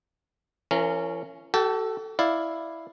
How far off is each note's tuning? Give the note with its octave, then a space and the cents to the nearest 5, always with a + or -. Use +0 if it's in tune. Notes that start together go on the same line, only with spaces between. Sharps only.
E3 +45 C#4 +0 A#4 -25
F#4 +45 A4 +0 G5 +0
E4 +0 D5 +0 F5 +0